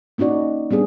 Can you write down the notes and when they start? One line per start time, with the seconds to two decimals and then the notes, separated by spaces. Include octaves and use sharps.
0.18 A#3 C#4 D#4 F#4 D5
0.71 G3 B3 D4 G#4